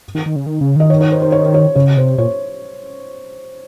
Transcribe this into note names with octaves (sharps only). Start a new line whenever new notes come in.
D#3
D#3
C#3
D#3
C#3
D#3 D#5
C#5
C#5
C5
C5
C#5
C#5
C#3 C#5
C3 C5
A#2 C#5